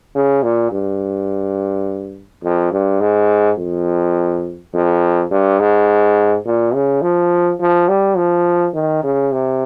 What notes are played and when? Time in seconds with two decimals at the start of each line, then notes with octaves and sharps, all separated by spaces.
0.15 C#3
0.43 A#2
0.72 G2
2.44 F2
2.72 G2
3.01 G#2
3.58 F2
4.74 F2
5.31 G2
5.60 G#2
6.46 A#2
6.74 C#3
7.02 F3
7.60 F3
7.89 G3
8.17 F3
8.74 D#3
9.04 C#3
9.32 C3